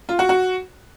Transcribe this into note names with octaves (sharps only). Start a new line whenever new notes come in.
F4
F#4
F#4